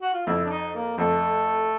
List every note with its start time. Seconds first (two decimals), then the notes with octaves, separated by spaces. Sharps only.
0.02 F#4
0.14 F4
0.26 F2 E4
0.45 D4
0.50 D#4
0.75 A#3
0.98 F2 A3